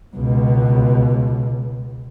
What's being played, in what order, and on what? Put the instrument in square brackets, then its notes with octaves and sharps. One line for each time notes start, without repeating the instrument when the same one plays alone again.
[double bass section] C#2 B2